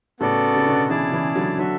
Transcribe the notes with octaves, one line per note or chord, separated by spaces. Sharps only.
A2 C#3 B3 F#4 A4 D5
C#3
B2 D3
C#3 E3 E4 G#4 D5 A5
C#3 E3
D3 F#3
D3 F#3 F#4 A4 E5